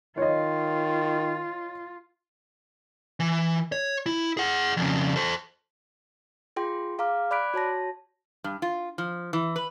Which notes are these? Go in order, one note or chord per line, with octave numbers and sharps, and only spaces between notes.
D#3 F4 C#5 D#5
E3
C#5
E4
G#4 F#5
F2 C#3
A4 C5
F4 G#4 G5 C6
G#4 F5 A#5 D6 F6
D5 B5 D6 F#6 B6 D7
F#4 C#5 A5 A#6
G2
F4
F3
E3
B4